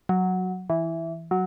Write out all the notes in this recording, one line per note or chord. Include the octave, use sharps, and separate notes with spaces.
F#3
E3
F#3